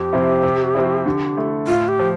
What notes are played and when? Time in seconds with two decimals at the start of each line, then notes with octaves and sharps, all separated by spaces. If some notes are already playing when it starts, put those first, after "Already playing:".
Already playing: F2 G4
0.13 C3 F3 C4 E4
0.43 C3
0.75 F3 C4 E4
1.06 D3
1.37 A3 E4
1.67 A2 F4
1.88 G4
1.99 F3